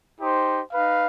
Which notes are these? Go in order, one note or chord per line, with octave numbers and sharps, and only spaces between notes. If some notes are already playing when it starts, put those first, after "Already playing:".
D#4 G4 C5
D#4 B4 F5